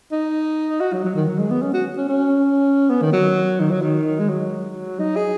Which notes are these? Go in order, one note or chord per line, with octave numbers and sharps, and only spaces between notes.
D#4
F#4
F#3
F#3
D#3
F#3
G#3
B3
C#4
F#4
C#4
C#4
B3
D#3
F#3
D#3
F#3
D#3
G#3
F#3
D#4
G#4